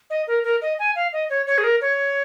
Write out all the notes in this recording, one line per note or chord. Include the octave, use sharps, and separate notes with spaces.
D#5
A#4
A#4
D#5
G#5
F5
D#5
C#5
C#5
G#4
A#4
C#5